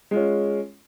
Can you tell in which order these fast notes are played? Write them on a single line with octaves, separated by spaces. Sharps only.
G#3 F4 C#4